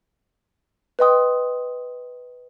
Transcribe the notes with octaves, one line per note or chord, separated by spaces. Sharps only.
B4 D#5 G5 C6 D#6